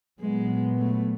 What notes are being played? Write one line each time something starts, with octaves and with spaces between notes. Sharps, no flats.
A#2 F#3 G#3 B3
A3